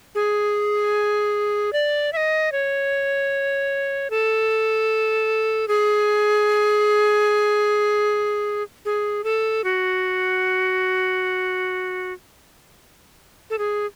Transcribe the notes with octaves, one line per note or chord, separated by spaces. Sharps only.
G#4
D5
E5
D#5
C#5
A4
G#4
G#4
A4
F#4
A4
G#4